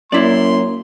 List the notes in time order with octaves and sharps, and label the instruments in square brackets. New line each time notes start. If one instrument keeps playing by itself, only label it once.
[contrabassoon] F#2 [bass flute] A#3 [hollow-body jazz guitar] E4 D5 [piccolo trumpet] C6